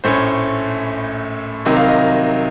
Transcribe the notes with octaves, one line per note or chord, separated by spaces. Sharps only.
A#1 A2 A3 C#4 C5
C2 C3 D#3 F#3 D#5
F5
D#5